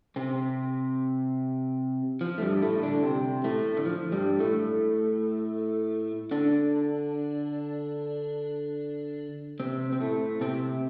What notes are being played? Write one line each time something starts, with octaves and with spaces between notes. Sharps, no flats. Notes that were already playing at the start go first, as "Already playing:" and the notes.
C3 C4
F3
A3
G2 G3
A2 A3
D3 D4
C3 C4
A2 A3
D3
F3
G2 G3
A2 A3
D3 D4
C3 C4
C4
A2 A3
C3 C4